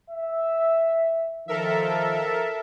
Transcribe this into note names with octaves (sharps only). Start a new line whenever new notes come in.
E5
D#3 F3 A4 A#4 E5